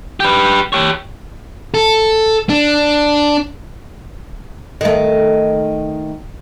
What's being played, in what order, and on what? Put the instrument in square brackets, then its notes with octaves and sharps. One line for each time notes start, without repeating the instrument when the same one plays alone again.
[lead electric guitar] G4 B4
G4 C#5
[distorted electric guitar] A4
D4
[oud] D#3 A3